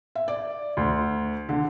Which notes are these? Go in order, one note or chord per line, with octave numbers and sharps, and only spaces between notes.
E5
D5
D2
D3